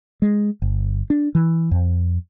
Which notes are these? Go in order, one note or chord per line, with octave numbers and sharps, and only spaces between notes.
G#3
G1
D4
E3
F2